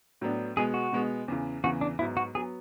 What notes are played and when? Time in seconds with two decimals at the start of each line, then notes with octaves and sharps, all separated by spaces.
0.21 A2 F#3 B3 D4
0.57 B2 G#3 B3 G#4
0.74 F#4
0.92 B2 G#3 B3
1.28 E2 C#3 E3
1.64 E2 C#3 E3 F#4
1.81 D4
1.99 G#2 F#3 B3 E4
2.17 F#4
2.34 F#3 B3 G#4